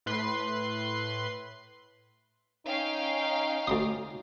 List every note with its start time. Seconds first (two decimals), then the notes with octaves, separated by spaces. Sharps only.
0.06 A2 B4 C6 C7
2.66 C#4 D#4 F5 G5
3.67 D2 C6 D#6